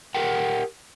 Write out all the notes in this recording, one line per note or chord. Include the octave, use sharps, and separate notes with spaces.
G4 A#4 F#5 G5